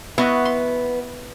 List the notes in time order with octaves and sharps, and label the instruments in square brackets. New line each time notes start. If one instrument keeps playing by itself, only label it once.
[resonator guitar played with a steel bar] B3 [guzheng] E4 F#4 D#5
[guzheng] C6